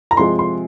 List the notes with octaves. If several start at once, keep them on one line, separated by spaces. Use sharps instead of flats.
A#5
C3 F3 G#3 C6
C6